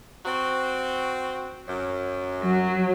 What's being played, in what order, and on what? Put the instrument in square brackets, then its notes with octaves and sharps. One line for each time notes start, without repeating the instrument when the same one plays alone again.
[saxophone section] C4 F#4
F#2
[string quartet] F#3